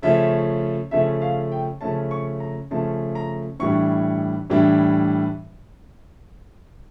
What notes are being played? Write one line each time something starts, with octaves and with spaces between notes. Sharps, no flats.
C#3 F3 A3 C#4 E5
C#3 F3 A3 C#4 E5
F5
G5
C#3 F3 A3 C#4 A5
C#6
A#5
C#3 F3 A3 C#4 A5
A#5
A2 E3 G3 D4 C#6
A2 E3 G3 D4